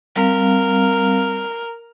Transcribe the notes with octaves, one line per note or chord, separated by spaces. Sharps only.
G3 C4 A#4 F5